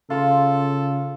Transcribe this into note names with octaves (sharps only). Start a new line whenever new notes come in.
C#3 F4 A4 C6